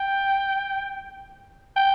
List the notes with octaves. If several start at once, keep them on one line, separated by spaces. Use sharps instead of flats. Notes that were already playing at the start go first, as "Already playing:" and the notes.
Already playing: G5
G5